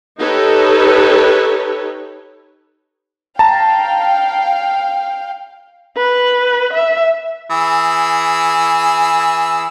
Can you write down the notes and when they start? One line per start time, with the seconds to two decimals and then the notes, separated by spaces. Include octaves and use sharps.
0.19 D#4 G4 A4 B4 C#5
3.39 F5 G5 A5 A#5
5.97 B4
6.74 E5
7.51 E3 G#4 E6